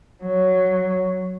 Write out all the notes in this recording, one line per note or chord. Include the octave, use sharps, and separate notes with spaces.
F#3